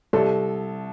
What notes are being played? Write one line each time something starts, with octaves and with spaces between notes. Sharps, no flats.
C2 A4